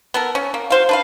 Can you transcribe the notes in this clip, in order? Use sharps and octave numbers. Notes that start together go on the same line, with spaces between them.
B3 A4 A#4
C#4
A#3
F#4 C5 F5
D4 B4 F5